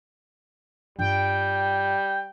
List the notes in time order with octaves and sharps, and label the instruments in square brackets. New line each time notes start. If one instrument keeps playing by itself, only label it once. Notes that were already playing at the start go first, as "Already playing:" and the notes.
[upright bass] G2 F4 [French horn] G3 [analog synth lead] G5